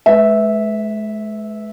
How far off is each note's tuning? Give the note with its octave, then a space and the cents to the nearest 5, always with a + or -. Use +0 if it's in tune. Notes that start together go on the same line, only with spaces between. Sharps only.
G#3 +45 B4 +0 E5 -10